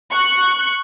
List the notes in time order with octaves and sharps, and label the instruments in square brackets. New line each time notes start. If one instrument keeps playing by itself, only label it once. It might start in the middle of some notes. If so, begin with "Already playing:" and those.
[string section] C#6 F#6